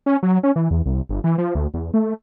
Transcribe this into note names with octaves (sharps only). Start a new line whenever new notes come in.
C#4
F#3
C#4
E3
E2
C2
G1
E3
F3
D2
E2
A3